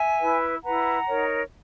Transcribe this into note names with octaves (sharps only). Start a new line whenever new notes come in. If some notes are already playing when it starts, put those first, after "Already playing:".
Already playing: E5 G#5
E4 B4
E4 B4 F#5 A#5
D#4 A#4 C#5